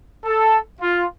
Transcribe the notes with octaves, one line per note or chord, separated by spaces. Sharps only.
A4
F4